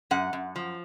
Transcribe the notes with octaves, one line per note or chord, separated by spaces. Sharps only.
F#2 F#5
F#2
F3